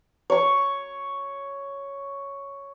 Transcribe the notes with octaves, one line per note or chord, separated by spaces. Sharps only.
C#5 C#6